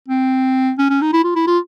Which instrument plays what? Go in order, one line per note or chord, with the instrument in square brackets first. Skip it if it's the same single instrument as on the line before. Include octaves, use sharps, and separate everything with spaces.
[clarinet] C4
C#4
C#4
D#4
E4
F4
E4
F4